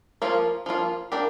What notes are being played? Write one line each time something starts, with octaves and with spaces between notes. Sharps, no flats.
F3 A#3 F4
F3 A#3 F4
A#3 D4 G4 D5